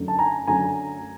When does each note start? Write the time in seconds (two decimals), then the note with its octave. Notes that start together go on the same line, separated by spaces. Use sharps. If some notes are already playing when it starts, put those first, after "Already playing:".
Already playing: F#2 D3 F#3 A3
0.08 A5
0.19 G#5 A#5
0.47 F#2 D3 F#3 A3 G#5 A#5